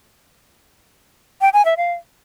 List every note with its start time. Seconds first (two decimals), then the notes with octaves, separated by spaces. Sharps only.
1.41 G5
1.53 G#5
1.65 E5
1.77 F5